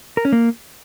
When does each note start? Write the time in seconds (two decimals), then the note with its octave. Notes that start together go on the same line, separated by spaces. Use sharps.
0.17 A#4
0.25 C#4
0.33 A#3